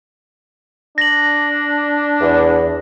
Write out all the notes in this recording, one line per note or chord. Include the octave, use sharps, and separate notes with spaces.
D4 A#6 F#7
E2